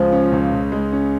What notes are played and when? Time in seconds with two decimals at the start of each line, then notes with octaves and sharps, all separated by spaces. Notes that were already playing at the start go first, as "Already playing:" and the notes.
Already playing: C#2 C#3 F3 G#3
0.12 C#4
0.32 C#2
0.52 C#3
0.72 G#3
0.93 C#4